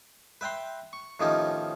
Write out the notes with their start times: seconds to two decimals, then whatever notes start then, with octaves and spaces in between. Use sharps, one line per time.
0.41 B4 E5 G5 A#5 C6
0.93 C#6
1.20 A2 D#3 F3 C#4 D#4 G4